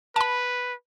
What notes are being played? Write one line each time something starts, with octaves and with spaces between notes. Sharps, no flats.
B4 A5 B5